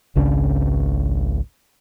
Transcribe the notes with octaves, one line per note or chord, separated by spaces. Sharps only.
G#1 C#2 C#3 D4